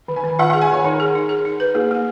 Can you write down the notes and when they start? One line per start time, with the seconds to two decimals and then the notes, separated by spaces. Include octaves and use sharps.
0.08 D#3
0.16 G#5
0.24 D#3
0.39 F4 F#5
0.50 F#5
0.53 G#4
0.61 G#5
0.69 D#3 C#5
0.84 D#4 A#4
1.00 G#4
1.15 D#4
1.29 G#4
1.45 D#4
1.60 B4
1.75 A#3 G#4
1.91 A#3